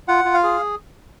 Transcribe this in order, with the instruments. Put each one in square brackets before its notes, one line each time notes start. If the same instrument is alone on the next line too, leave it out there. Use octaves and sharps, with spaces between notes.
[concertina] F4 F#5
F4
F5
G#4